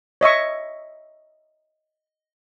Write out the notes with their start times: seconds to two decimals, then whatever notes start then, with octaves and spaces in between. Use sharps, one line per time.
0.21 C#5 D#5 E5 C#6